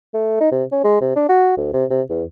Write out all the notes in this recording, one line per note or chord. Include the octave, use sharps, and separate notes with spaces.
A3
D#4
C3
C#4
G#3
C3
D4
F#4
D2
C3
C3
E2